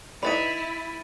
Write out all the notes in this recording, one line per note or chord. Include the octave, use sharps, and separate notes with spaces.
D#4 E4 B4 D5 B5 A6 D#7